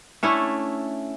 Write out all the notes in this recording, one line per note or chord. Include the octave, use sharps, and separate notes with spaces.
A3 C#4 D4 E4